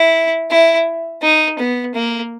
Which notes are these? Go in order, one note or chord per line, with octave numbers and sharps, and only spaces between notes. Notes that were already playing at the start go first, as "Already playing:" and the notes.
Already playing: E4
E4
D#4
B3
A#3